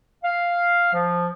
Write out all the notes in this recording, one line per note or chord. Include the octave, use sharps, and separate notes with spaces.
F5
F3